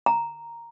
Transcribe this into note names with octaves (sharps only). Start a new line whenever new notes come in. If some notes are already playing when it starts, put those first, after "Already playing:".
A#5